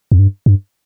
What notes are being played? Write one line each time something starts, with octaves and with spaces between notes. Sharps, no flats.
F2
G2
G2